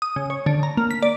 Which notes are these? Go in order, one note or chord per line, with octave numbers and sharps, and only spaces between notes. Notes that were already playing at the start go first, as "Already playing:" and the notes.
D#6
C#3
C#5
D3
A#5
A#3
B6
D5